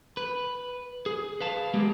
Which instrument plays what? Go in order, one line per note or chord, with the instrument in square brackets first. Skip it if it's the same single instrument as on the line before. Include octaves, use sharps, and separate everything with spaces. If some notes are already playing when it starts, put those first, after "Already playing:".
[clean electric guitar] B4
G#4
B4 F5 A5
G#3 A#3 B3 G4